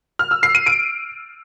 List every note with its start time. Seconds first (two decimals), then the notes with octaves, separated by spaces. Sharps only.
0.19 F6
0.31 E6
0.43 C7
0.55 D#7
0.66 D7